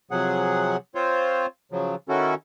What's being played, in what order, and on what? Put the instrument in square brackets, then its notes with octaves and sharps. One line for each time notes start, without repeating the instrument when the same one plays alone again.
[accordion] C3 F3 F#3 G#4 F#5
C4 F4 C5 C#5
C#3 F3 F#3
D#3 C#4 E4 F#4 A4